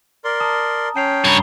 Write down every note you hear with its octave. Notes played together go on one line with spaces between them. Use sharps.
A#4 D5 C6
A5 A#5 D#6
C#4 G5 A5 C7 F7
G2 C#5 A#5 B5 G7